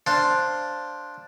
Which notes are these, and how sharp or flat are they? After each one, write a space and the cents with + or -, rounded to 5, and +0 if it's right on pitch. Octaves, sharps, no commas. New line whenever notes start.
D4 +0 C5 +0 F5 +0